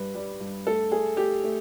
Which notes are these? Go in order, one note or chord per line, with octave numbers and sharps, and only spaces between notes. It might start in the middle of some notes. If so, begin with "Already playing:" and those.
Already playing: G2 G3 B4
G3
G2
A3 A4
A3 G#4
A3 G4
A3